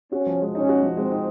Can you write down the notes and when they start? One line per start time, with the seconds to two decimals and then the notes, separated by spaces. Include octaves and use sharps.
0.12 C#4 F#4
0.27 F3
0.41 G#3
0.55 C#4 D#4
0.69 F#4
0.83 F3
0.97 G#3 C4
1.12 D#4